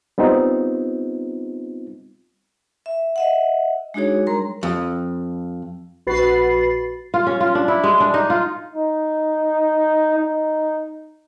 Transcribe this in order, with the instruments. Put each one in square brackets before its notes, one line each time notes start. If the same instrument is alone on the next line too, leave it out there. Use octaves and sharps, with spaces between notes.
[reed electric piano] G3 B3 C4 D#4 F4
[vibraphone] E5
D#5 E5 F#5
G#3 D4 D#4 F#4 G#4 C#5
G3 A#4 A#5 C6
[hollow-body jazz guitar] F2
[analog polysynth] A#1 F#4 B4 B5 A6 C7
[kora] F4
C#4
F4
D4
E4
G#3
D4
D#4
F4
[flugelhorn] D#4
D#4